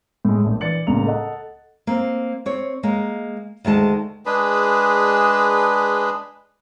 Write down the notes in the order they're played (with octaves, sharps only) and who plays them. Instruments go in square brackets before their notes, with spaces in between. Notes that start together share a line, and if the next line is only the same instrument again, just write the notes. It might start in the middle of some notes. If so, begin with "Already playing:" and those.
[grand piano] A2 G#3
A#1 A3
E3 D5 A6 C#7 F#7
C#2 A2 A#3 A#5 F7
A4 D#5 F#5
[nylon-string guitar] A#3 C4
C4 C#5
G#3 A#3
D2 D#3 G#3 A5
[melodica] G#3 D4 G#4 B4